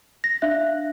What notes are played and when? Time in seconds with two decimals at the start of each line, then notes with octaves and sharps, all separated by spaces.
0.24 A#6
0.42 D4 E5 F5 F#6